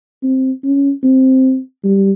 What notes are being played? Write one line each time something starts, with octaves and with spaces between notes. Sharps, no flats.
C4
C#4
C4
G3